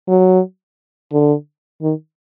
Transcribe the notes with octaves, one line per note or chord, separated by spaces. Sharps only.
F#3
D3
D#3